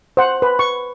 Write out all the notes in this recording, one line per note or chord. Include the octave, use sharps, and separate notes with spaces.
C5 F#5
B4
C#6